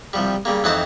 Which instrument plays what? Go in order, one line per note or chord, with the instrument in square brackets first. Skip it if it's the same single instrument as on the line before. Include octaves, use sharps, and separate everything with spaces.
[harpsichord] C2 F3 G3
C#3 G3 A#3
F2 E3 C4 D#4 F#5 A5